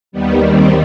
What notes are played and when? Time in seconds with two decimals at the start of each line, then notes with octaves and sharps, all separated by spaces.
0.12 D#2 D#3 G3 B3
0.46 C4